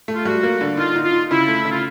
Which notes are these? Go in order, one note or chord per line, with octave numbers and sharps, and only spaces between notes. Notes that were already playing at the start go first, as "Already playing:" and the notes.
A3
F4
G3 F#4
A#3
D3
D#4 F4
D#4
F4
D#4
C#3 E4
A3
C#3
F4